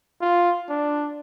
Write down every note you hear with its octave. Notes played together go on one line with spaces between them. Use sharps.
F4
D4